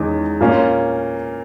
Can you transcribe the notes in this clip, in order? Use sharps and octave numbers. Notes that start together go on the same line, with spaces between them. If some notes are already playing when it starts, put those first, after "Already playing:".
Already playing: E2 D#3 G#3 C#4
A#2 A#3 C#4